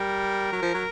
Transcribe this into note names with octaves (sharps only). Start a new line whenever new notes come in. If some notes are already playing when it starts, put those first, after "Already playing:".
Already playing: G3 A#4
F#3
F3
F#3